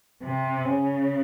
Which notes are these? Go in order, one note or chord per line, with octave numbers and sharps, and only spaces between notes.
C3
C#3